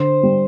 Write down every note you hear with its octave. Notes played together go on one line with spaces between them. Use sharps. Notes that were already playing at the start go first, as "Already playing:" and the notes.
Already playing: D3 C5
G3